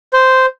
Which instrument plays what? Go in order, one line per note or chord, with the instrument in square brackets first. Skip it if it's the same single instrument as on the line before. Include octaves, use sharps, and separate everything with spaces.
[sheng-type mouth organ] C5